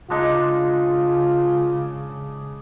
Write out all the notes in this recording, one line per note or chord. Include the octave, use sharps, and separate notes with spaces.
C#3 G#3 D4 D#4 F4